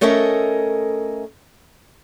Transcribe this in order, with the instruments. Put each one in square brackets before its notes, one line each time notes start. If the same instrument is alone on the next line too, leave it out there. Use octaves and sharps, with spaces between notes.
[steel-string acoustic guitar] A3 C#4 A4 A#4 D#5 E5